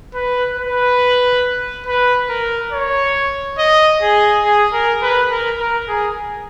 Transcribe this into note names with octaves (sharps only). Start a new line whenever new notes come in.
B4
B4
B4
A#4
C#5
D#5
G#4
G#4
A#4
B4
A#4
A#4
G#4